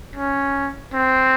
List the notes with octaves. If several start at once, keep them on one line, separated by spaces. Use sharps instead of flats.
C#4
C4